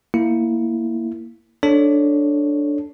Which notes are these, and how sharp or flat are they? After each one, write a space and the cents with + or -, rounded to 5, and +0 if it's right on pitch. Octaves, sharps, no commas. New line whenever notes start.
A#3 +0 E4 +0
D4 +0 A4 +0 C#5 +0